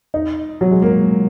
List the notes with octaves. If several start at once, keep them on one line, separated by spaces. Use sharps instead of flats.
D#4
F#3
G#3
A#3